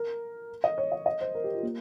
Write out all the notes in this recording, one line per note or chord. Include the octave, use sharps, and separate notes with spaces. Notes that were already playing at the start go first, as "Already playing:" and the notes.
Already playing: A#4
D#5
C#5
D#5
D#5
C5
A#4
G4
F4
A#3